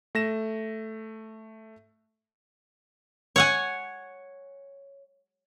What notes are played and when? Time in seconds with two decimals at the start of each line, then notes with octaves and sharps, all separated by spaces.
0.15 A3 A#6 E7
3.36 C#5 F#5 G#5